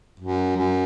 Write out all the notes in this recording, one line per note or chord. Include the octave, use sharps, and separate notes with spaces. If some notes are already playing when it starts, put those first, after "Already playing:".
F#2
F#2